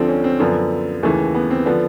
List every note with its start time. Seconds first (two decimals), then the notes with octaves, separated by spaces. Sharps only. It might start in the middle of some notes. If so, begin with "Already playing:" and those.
Already playing: D2 D3 F3 C4
0.08 C#4
0.24 C4
0.40 F#2 D3 F3 B3
1.03 D#2 C#3 E3 A3
1.35 B3
1.51 C4
1.66 D3 F3 B3